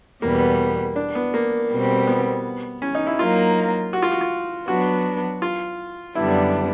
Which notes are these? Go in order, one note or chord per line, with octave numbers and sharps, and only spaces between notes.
E2 B2 G3 A#3 B3
D4
B3
A#3
B2 G3 C4
B3
C#4
D#4
E4
F#3 A#3 D#4 F4
F#4
F4
F#4
F4
F#3 B3 D4 F#4
F4
F#2 D3 G3 B3 D4 E4